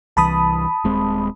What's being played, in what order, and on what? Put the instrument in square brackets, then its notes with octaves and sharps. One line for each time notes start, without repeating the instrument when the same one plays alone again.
[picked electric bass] C2 E3 [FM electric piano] A5 B5 D#6
[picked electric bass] D#1 G#3 C4